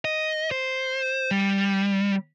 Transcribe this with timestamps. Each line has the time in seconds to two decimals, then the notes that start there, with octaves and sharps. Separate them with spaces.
0.05 D#5
0.51 C5
1.31 G3